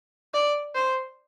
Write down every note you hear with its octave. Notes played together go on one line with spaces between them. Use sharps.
D5
C5